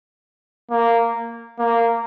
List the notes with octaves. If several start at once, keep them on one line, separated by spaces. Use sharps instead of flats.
A#3
A#3